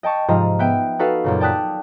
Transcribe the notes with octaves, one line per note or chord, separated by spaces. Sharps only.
D#5 G5 A5 C#6
G#2 C3 F3 F4 D#5 A#5
B3 E5 G5
D#4 F#4 A4 B4 F5
F#2 A#2 C#3
D5 G5 A5 D#6 F#6 B6